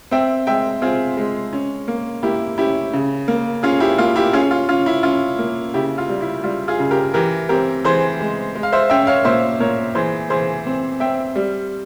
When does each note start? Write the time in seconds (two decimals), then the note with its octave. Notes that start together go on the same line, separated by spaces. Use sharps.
0.11 C4 E5 G5
0.47 G#3 E5 G5
0.82 C4 F4 G#4
1.17 G#3
1.53 C#4
1.88 A#3
2.23 A#3 E4 G4
2.58 C#4 E4 G4
2.93 C#3
3.28 A#3
3.63 C#4 F4 G#4
3.80 E4 G4
3.98 A#3 F4
4.16 E4 G4
4.33 C#4 F4 G#4
4.51 F4
4.69 C#4 F4
4.86 E4
5.03 C#4 F4
5.39 A#3
5.74 C#3 E4 G4
5.98 F4
6.09 G3
6.21 E4
6.44 G3 F4
6.68 F4 G#4
6.79 C#3
6.91 G4 A#4
7.14 E3 G4 A#4
7.49 C4 G4 A#4
7.84 E3 G#4 C5
8.20 G#3
8.56 G#3
8.63 F5
8.73 C5 E5
8.90 C#4 E5 G5
9.07 C#5 F5
9.25 A#2 C5 E5
9.60 A#2 A#4 C#5
9.95 E3 G#4 C5
10.30 E3 G#4 C5
10.66 C4
11.00 C4 E5 G5
11.36 G3